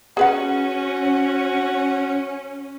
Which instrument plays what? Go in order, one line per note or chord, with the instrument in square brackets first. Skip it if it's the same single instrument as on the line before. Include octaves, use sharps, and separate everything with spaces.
[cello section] C#4 [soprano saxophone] F#4 [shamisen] G#4 B4 F#5